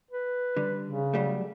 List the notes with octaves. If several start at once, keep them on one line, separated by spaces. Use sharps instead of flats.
B4
D3 G3
C#3
F#3 G3 A3